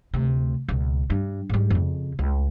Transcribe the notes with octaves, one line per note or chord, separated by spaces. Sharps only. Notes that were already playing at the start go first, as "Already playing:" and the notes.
D2 C3
C#2 B2
G2
G#2 G3
F2 C#3
C#2